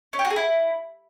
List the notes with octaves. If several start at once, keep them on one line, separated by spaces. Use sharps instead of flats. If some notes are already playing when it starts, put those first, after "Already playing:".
C#4
G4
F#4
G#4
E4